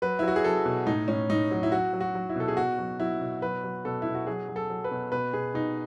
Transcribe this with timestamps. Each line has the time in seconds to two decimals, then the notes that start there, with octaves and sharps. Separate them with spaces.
0.02 F#3 B4
0.19 E4
0.23 F#3 F#4
0.36 G#4
0.44 F#3 A4
0.66 B2
0.87 A2 D#4
1.08 A2 C#4
1.30 A2 D#4
1.51 F#3
1.63 E4
1.72 F#3 F#4
1.93 F#3
2.00 F#4
2.15 F#3
2.29 E4
2.36 B2 A4
2.48 G#4
2.57 B2 F#4
2.78 F#3
3.00 F#3 E4
3.21 B2
3.42 F#3 B4
3.64 F#3
3.85 B2 A4
4.02 B2 E4
4.15 F#4
4.27 F#3 G#4
4.49 F#3
4.56 A4
4.70 F#3
4.84 B4
4.91 B2
5.12 B2 B4
5.33 B2 G#4
5.54 B2 D#4